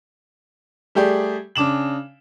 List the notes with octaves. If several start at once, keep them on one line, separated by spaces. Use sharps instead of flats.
G3 A3 G4 G#4 D5
C#3 D4 D6 E7 F#7